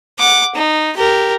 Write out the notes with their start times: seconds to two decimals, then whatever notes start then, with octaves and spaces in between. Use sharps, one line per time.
0.19 F#5 D6
0.55 D#4
0.97 G4 A#4